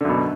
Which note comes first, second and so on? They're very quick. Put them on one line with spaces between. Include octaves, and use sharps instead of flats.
D3 F#2 B2